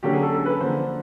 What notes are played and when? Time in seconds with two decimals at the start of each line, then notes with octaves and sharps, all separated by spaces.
0.03 D3 F#3 A#3 C#4 G4
0.13 G#4
0.22 A4
0.32 A4
0.46 B4
0.60 D3 F3 A#3 C5